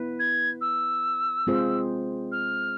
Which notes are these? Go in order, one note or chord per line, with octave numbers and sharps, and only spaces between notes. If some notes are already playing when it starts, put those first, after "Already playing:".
Already playing: B3 E4 B4
G#6
E6
G#3 C4 F4 G#4 C5
F6